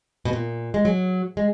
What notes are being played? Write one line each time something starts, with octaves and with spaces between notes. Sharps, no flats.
B2
A#2
G#3
F#3
G#3